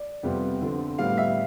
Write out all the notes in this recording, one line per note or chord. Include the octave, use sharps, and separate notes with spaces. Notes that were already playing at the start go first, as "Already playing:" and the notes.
Already playing: D5
F2 C3 G3 B3 F4
D3 F3 C4
A2 G3 B3 F5
E5